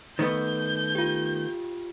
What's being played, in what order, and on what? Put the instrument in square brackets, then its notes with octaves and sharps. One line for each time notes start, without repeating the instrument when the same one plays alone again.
[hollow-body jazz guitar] D#3 A3 B3 [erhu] G6
[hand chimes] F4 G4